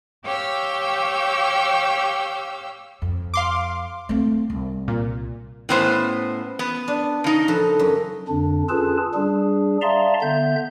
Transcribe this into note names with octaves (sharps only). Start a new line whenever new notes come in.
G4 C#5 F5 G5 E6
F2
F5 C6 D6
A3 C4
C2
A#2
A2 B3 C#4 C5 F5 F#5
B3
D4
C#3 D#4
F3 A4 B4
F#2
F2 D3 D4
C#4 F4 G#4 A4 B4 A5
G3 D4 G#4
D5 E5 F5 A5 A#5 C6
D3 B3 E5 G6